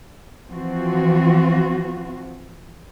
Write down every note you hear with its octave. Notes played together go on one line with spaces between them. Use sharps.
E3 F3 C4 F4 F#4